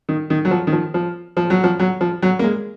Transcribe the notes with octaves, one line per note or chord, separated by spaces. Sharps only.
D#3
D#3
F#3
F3
D#3
F3
F3
F3
F#3
F3
F#3
F3
F#3
A#3
G#3